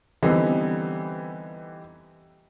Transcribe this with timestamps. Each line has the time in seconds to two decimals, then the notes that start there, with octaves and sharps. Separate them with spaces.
0.23 D3 E3 G3 B3 C4 D#4